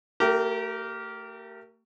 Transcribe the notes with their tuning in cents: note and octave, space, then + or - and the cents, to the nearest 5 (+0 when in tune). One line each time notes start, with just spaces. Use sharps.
A3 +35 G4 -25 A#4 +0